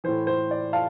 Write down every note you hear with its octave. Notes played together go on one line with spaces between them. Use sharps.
A2 E3 C5
C5
D5
F5 A5